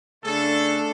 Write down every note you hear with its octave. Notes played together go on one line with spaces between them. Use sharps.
C#3 A3 D4 G#4 A4